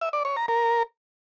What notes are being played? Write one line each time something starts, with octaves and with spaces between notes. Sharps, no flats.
E5
D5
C#5
A#5
A#4